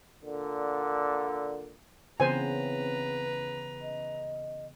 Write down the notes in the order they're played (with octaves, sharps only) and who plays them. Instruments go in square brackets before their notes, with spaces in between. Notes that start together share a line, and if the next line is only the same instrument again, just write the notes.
[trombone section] A#2 D3
[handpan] C#3 E3 B3 [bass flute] C4 [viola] B4 A#5 [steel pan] C5 G#5
[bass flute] D#5